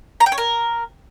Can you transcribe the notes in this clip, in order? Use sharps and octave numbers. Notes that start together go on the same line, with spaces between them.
A#5
G5
C#5
A#4